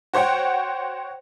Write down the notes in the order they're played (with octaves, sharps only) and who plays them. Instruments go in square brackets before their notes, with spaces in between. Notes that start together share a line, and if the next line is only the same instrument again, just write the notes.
[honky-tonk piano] F#4 C5 C#5 F#5 G5